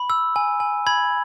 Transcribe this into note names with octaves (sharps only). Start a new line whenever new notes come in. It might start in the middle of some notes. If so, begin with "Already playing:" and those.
Already playing: B5
E6
G#5
G#5
B5 G#6